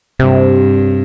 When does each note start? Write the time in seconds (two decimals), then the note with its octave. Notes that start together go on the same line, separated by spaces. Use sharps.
0.19 G2 C3